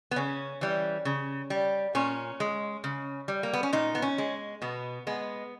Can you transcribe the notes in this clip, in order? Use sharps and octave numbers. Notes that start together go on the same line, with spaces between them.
B3
C#3 C#4
E3 G3
C#3
G3
A#2 C#4
G#3
C#3
G3
A#3
B3
C#4
A#2 D#4
B3
C#4
G#3
B2 B3
G#3 B3